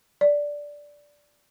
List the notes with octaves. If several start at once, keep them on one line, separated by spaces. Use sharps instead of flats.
D5